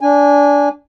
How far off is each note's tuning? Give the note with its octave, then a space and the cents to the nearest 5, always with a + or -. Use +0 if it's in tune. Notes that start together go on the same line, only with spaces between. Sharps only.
D4 -20 G#5 -15